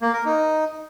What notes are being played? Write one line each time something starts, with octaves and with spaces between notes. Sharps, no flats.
A#3
A#4
D#4